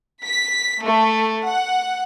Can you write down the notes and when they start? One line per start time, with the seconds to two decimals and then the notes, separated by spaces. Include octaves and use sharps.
0.22 B6
0.81 A3
1.47 F#5